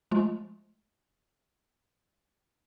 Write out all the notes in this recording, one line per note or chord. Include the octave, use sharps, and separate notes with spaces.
F3 G#3 A3 F4